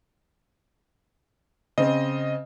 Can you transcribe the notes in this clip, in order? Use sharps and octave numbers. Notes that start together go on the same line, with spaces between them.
C#3 C4 D#5